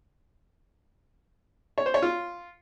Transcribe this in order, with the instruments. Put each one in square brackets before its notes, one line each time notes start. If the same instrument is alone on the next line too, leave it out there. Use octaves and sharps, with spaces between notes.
[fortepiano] C#5
C5
C#5
F4